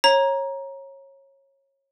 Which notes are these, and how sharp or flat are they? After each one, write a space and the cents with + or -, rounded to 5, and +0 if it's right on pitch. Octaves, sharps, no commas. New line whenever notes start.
C#5 -20 A#5 +15